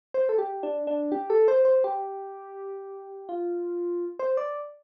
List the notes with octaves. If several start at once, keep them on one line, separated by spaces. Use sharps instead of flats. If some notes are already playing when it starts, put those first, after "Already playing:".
C5
A4
G4
D4
D4
G4
A4
C5
C5
G4
F4
C5
D5